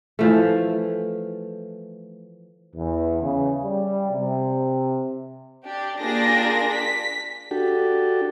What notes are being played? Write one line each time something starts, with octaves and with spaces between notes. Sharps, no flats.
E3 F3 A3
E2
C#3
G3
C3
D4 G4
A#3 D4 F4 G4 G#4 A#6
B6
D4 F#4 G4 A4